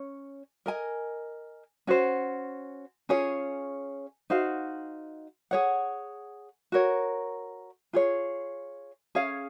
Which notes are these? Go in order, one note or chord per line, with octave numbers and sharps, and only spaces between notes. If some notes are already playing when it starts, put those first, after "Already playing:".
Already playing: C#4 C#5
A#4 D#5 G#5
C#4 F#4 C5
C#4 F4 G#4 C#5
D#4 F#4 C5 F5
G#4 C#5 F#5
F#4 A#4 C#5
F4 G#4 C#5
C#4 G#4 C#5 F5